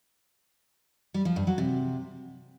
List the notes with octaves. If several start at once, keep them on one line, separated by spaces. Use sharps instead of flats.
G3
F3
G2
F#3
C3